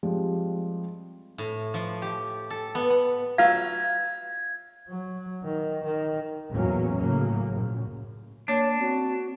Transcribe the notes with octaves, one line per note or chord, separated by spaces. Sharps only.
F3 G3 G#3 C4
A2
F3
G4
A4
B3
B3
F#3 F4 E5 F5 G#6
F#3
D#3
D#3
A1 E2 A#2 F#3 A#3 C#4
A2 C#3 F#3 A#3
A#1 F#2
A#3 D4 C#5
C4 F#4